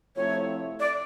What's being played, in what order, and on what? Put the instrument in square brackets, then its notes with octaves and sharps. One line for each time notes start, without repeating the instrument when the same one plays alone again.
[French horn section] C3 F3 A3 C4 E4 [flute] C#5
[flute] D5